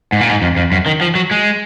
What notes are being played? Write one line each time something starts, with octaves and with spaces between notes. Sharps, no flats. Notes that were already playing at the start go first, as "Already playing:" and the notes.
G#2
A#2
G#2
F2
F2
F#2
D#3
F3
F#3
G#3